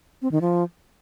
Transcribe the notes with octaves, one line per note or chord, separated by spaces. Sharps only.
C4
D#3
F3